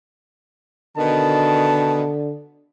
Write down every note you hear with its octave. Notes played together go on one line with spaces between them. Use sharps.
B2 D3 D#3 A5